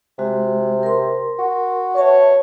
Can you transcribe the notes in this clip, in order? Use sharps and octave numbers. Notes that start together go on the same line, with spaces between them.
C3 G#3 F#4
A#4 C6
F#4
B4 C#5 E5 A5